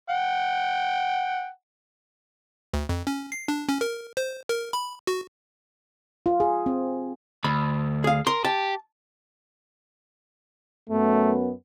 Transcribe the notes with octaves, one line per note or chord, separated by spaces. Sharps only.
F#5 G5
D2
F2
C#4
C7
D4
C#4
A#4
C5
A#4
B5
F#4
F4
G#4
C4
D2 B5
G#4 F5
A#4 C6
G4 A5
F#2 A3 B3